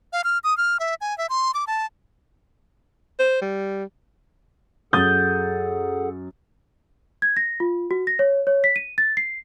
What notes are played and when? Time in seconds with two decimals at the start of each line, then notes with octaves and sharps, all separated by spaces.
0.13 F5
0.24 F6
0.44 D#6
0.57 F6
0.80 E5
1.01 G#5
1.18 E5
1.29 C6
1.54 D6
1.67 A5
3.20 C5
3.41 G3
4.93 F#2 G#4 A4 F#5 D#6 G6 A6
7.22 G#6
7.37 A#6
7.60 F4
7.91 F#4
8.07 A#6
8.19 C#5
8.47 C#5
8.64 B6
8.76 D#7
8.98 A6
9.17 C7